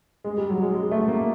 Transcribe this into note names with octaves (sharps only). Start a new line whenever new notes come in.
G#3
G3
F#3
G#3
G#3
A3
A#3